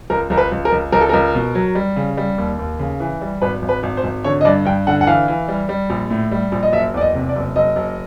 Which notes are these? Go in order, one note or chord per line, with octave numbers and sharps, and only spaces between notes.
C#2 A#4
C#2 A#4
B4
C#2
A#4
C#2
C#2 A#4
A4
C#2 A#4
B2
F#3
G3
C#3
G3
D#2
D#2
C#3
E3
G3
G#1 B4
G#1
B4
G#1
C5
G#1
D3 C#5
D#5
G2 D5
G2 G5
D3 F#5
F#5
E3 F5
E3
G3
G3
A#1
A2
G3
A#1
D#5
F#1 E5
E2 D5
D#5
C3
D5
F#1
F#1 D#5
F#1